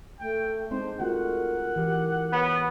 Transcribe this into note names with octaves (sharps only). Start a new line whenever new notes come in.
A3 G5
G#3 C4 D4 D#4 C5
A3 F4 F#4 A#4 F#5
E3 G4
B3 C#5